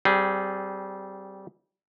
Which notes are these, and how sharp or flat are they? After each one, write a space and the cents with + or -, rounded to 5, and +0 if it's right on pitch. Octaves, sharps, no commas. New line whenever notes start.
G3 -20 C4 +0 G#4 +0